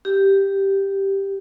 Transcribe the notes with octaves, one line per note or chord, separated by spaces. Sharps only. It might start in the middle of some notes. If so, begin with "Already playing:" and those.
G4